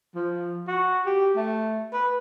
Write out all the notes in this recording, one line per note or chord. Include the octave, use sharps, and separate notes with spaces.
F3
F#4
G4
A3
B4